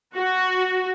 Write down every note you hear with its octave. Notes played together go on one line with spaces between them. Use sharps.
F#4